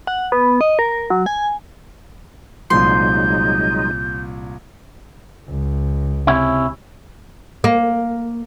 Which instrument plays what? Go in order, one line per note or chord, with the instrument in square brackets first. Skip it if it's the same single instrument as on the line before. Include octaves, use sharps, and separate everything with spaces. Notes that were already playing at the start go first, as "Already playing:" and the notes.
[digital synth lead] F#5
B3
D#5
A#4
F#3
G#5
[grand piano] C2 A#2 F3 [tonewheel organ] F#3 G#3 D#4 [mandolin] C6 [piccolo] G6
[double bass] C#2
[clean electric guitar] C3 C#4 E4
[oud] A#3